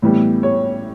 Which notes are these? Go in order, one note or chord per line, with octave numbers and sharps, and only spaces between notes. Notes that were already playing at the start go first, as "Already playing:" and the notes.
A2 E3 G3 B3
C#5